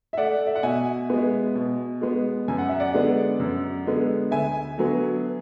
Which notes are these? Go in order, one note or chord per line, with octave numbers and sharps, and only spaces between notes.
E5
A3 D5 F#5
E5
F#5
B2 E5 G#5
G#3 B3
B2
G#3 B3
F#2 G#5
F#5
E5
D5 F#5
D3 G#3 B3
F#2
D3 G#3 B3
D2 E5 G#5
D3 F#3 B3